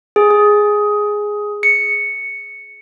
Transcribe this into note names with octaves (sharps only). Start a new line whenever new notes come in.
G#4
G#4
C#7